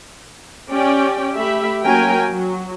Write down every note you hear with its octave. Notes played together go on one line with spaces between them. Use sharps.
C#4 G4 D5 G5
A3 G4 E5 B5
F#3 A#3 C#4 A#4 G5 G#5
F#3